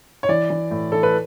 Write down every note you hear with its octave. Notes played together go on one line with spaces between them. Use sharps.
C#5
E3 D5
E3
A2
E3 A4
B4